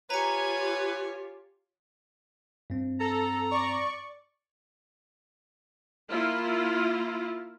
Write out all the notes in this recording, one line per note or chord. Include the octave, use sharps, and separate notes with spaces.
F4 G4 B4 C#5 G#5 A#5 C#7
G2 C4
A4 A#5
D5 C#6
A#3 E4 F4